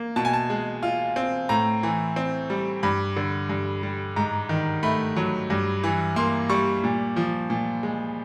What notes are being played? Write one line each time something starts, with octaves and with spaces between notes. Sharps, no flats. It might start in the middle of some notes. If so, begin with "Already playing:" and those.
Already playing: A#3
B2 A5
G#5
A5
G#3
F4
C4
A2 A#5
E3
C4
G3
G2 B5
D3
G2
G3
G#2 A#5
D#3
A3 B5
F#3
G2
E3
A#3 C6
G3 C#6
A#2
F3
A#2
G#3